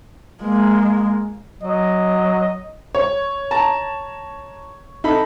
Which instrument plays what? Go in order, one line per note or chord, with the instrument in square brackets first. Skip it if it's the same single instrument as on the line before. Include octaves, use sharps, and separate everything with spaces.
[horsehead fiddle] G#3 A#3
[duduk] F#3 [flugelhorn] D#5
[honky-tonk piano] C#5
[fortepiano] A5 A#5
D#4 A4 B5